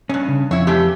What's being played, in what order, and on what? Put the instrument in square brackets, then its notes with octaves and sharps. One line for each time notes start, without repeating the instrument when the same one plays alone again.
[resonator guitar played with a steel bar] E2 G2 [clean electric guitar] C#4
[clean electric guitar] C#3
[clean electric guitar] F2 [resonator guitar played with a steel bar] E4 C#5
[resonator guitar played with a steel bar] E3 A3 G4